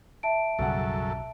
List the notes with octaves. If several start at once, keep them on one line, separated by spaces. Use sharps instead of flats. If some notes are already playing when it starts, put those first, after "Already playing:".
E5 A5 D7
B1 F#2 C#3 G3 A4 F#5